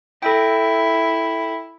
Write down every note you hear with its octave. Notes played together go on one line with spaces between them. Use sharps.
E4 A4 G5